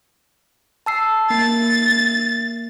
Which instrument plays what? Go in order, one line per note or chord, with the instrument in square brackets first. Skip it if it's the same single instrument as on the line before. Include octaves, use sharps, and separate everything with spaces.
[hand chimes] A5 E6 C7
[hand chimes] A#3 C7 [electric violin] A6